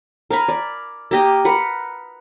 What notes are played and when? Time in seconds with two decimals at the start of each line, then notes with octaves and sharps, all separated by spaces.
0.30 A#4 F5 G#5 B5
0.48 D5
1.11 A#3 G4 D#5
1.45 A#4 B4 F#5